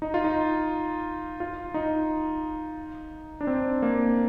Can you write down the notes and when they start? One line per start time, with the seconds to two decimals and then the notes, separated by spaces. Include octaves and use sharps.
0.02 D#4
0.14 F4
0.24 D#4
1.40 F4
1.74 D#4
3.41 D4
3.47 C4
3.82 A#3